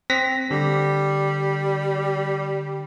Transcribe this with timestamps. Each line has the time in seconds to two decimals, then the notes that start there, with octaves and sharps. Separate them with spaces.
0.10 C4 A#6 B6
0.51 D3 G3